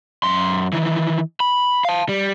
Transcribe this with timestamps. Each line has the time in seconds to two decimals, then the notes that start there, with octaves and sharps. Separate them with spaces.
0.24 F#2 C6
0.73 D#3 E3
1.40 B5
1.85 F5 A5
2.09 G3